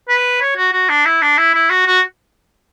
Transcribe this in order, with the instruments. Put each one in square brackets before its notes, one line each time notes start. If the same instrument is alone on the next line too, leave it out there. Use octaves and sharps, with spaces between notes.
[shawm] B4
C#5
F#4
F#4
D4
E4
D4
E4
E4
F#4
F#4